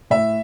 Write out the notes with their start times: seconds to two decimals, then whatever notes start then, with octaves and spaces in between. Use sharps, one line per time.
0.10 A2 E5